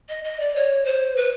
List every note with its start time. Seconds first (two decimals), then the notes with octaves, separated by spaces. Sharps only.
0.09 D#5
0.24 D#5
0.40 D5
0.55 C#5
0.85 C5
1.16 B4